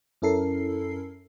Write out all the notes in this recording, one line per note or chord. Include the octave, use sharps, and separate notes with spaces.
F#2 C#4 E4 A4 A#4 C7